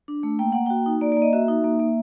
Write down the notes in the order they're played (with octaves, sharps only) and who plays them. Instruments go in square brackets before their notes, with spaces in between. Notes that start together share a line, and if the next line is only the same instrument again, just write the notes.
[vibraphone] D4
A3
A#3 G5
A#3 F#5
F#4 G5
D#4
A#3 D5
D5
A#3 D#5
F#4 E5
D#4 E5
A#3
A#3